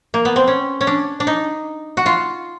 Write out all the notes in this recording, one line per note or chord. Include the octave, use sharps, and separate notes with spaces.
A#3
B3
C4
C#4
C#4
D4
D4
D#4
F#4
F4